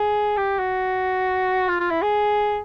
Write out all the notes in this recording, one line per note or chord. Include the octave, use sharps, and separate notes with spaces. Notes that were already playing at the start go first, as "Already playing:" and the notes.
Already playing: G#4
G4
F#4
F4
F4
E4
G#4